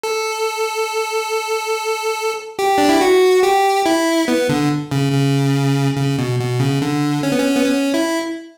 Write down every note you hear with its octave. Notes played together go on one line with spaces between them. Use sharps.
A4
G4
D4
E4
F#4
G4
E4
B3
D3
C#3
C#3
C#3
B2
B2
C#3
D3
C#4
B3
C#4
B3
C#4
E4